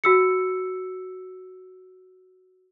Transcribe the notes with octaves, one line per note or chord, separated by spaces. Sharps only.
F#4 E6 C#7